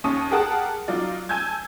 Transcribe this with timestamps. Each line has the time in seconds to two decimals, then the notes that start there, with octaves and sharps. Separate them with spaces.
0.04 D#2 C#4 A5 C#6 D#6
0.31 G4 G#4 A#4 F#5 A5 D#6
0.88 F#3 D#4 F4 D5
1.29 G#5 A5 E6 G6 G#6